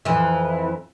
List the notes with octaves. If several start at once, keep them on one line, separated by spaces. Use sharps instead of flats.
F2 E3